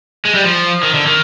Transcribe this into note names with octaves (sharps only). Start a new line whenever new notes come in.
G#3
G3
F3
D#3
D3
D#3